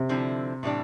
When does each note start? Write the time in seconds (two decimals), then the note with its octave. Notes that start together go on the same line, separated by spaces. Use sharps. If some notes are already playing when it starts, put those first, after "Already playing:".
Already playing: C3
0.09 D3 F3 C4 E4
0.63 A2 E3 G3 D4